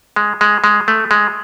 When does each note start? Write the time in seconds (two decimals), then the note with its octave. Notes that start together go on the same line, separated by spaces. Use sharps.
0.16 G#3
0.41 G#3
0.64 G#3
0.88 A3
1.11 G#3